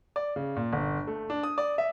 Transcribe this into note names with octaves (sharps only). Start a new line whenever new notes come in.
D5
C#3
A#2
G1
A3
D4
D#6
D5
E5